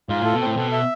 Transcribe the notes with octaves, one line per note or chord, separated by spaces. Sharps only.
G#2 F4
A2 A4
B2
A2 C4
B2 A4
E5